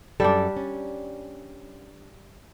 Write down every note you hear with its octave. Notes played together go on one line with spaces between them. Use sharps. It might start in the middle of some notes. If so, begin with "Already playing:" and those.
F#2 G3 D4 A4
C#4